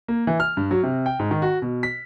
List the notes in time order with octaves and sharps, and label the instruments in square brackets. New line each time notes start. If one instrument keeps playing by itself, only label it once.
[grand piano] A#3
E3
F6
G2
F#3
C3
G5
G#2
D#3
F#4
B2
B6